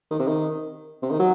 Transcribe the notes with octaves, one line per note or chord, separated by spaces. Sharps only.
D#3
C3
D#3
C3
D#3
F#3